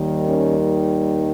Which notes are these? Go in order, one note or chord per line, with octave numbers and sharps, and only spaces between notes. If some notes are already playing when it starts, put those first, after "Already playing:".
Already playing: D#2 D#3 G3
C#4